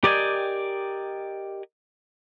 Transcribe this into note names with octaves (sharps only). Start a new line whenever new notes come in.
G4 A#4 D5 D#5 G5 G#5